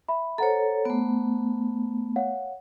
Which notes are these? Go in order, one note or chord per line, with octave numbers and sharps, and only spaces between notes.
E5 B5
A4 C5 C#5 F#5 A#5
A3 B3
C#5 F5 F#5